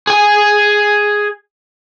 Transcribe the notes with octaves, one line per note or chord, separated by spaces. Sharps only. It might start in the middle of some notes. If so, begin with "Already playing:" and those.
G#4 G#5